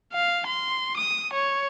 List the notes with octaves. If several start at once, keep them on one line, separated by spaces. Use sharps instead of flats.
F5
C6
D#6
C#5